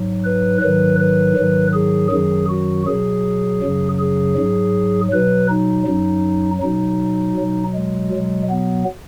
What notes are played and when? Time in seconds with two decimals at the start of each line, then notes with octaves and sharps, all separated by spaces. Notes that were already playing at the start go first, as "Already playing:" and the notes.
Already playing: G#2 F#3
0.24 B4
0.61 G#2 D#3 F#3 B4
0.99 B4
1.36 G#2 D#3 F#3
1.74 G#4
2.12 F#2 D#3 F#3 G#4
2.49 F#4
2.87 B2 F#3 G#4
3.62 F#2 C#3 F#3
4.00 G#4
4.37 G#2 F#3
5.12 B2 F#3 B4
5.49 D#4
5.87 F#2 F#3
6.62 B2 F#3 D#4
7.37 B2 F#3
7.75 G#3
8.13 B2 F#3
8.50 B3